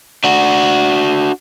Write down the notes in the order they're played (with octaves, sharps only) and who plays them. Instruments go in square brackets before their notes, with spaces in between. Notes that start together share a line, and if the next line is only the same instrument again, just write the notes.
[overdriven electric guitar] D4 F#4